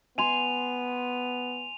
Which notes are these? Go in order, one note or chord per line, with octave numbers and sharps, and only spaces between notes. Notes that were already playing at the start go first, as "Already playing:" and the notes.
B3 G#5 C6 D#7 F7